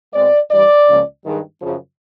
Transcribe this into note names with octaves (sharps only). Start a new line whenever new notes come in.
B2 G#3 C4 D5
G2 E3 G3 D5
C#2 C#3 F3 A#3 C#4
G2 D#3 G#3
F#2 C#3 F3